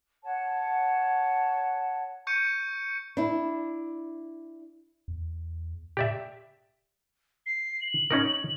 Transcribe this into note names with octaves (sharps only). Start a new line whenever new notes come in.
C#5 F#5 A5
C#6 G6 C#7 D#7
D4 E4
E2
G4 D5 E5
C7
F#7
C#4 D#4 A#4